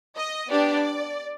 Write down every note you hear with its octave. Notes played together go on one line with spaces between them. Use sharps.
D#5
B3 D4 G4 D5